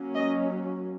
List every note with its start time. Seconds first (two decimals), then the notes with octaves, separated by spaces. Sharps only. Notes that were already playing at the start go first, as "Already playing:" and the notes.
Already playing: F#3 A#3 C#4
0.15 D#5